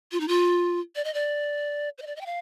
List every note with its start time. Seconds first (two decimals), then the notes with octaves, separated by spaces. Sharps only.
0.12 F4
0.20 D#4
0.28 F4
0.96 D5
1.05 D#5
1.14 D5
1.98 C5
2.02 D#5
2.07 D5
2.16 D#5
2.21 G5
2.26 F5